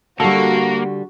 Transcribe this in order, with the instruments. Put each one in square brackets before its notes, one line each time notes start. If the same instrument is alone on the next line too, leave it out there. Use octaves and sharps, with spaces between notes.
[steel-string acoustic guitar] D3 G3 [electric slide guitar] A#3 [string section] F#4 [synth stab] A4